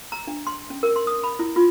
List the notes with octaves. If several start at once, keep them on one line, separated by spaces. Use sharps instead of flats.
A#5
D4
C6
C#4
A#4
C6
D#6
B5
E4
F4